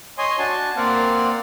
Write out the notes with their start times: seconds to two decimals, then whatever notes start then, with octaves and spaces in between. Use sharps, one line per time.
0.18 C#5 D#5 G#5 C6 D#6
0.39 D4 F#4 G#5 A5
0.76 A#3 C4 D5 F5 F#5